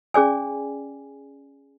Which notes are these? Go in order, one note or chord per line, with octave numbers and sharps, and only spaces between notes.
C#4 G#4 D5 G#5